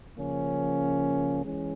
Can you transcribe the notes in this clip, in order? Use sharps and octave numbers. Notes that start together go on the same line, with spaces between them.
C#3 F3 A#3 C#4
E3 G#3 C#4